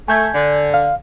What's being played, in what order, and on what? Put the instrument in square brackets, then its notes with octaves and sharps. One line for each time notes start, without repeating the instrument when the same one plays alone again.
[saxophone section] A3 [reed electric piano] G#5 G6 G#6
[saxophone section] D3
[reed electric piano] F5